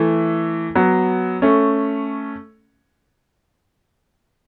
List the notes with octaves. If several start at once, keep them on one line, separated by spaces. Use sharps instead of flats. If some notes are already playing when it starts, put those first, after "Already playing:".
Already playing: E3 A3
F#3 B3
A3 C#4